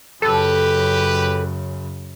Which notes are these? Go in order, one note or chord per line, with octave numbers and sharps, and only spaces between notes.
F#2 C#3 G4 A4 B4